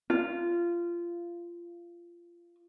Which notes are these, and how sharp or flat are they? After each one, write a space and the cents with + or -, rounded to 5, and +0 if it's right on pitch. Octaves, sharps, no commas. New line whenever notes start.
F4 -20